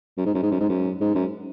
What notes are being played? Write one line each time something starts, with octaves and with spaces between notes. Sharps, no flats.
F#2
G#2
F#2
G#2
F#2
G#2
F#2
G#2
F#2